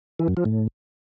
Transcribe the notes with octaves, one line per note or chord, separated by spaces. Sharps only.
E3
F#2
F3
A2